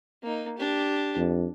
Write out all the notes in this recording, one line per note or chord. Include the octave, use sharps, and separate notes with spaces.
A#3 D#4
D4 G4
F2